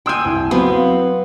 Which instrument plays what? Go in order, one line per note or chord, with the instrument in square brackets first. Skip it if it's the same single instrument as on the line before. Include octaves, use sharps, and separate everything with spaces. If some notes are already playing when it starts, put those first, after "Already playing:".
[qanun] G5 G#5 [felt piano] C6 E6 G6
[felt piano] C2
[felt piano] F#3 [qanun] B3 [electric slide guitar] C4 C5 F5